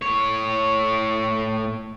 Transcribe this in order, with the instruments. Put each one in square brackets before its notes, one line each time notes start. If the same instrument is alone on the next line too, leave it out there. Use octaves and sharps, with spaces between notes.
[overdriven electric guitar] A2 C#5